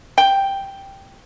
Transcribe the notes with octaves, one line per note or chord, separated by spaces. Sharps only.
G5